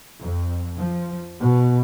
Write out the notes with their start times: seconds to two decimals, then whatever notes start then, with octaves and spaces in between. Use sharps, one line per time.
0.20 F2
0.78 F3
1.39 B2